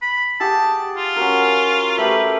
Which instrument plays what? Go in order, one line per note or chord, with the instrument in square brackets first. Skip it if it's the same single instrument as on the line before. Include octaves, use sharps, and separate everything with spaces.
[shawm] B5
[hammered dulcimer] G4 G#4 F#5 [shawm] A5
[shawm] F4
[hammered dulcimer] C#4 F#4 A#4
[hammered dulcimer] A3 G4 A#4 [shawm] B4